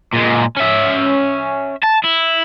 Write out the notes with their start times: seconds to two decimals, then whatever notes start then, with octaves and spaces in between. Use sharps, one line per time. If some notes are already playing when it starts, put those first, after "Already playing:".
0.14 A#2 G#3
0.57 C#4 E5
1.84 A5
2.04 E4